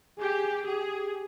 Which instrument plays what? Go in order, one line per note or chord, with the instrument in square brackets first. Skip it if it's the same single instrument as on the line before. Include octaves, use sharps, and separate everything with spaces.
[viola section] G4 [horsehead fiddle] G#4
[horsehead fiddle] G4 [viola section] G#4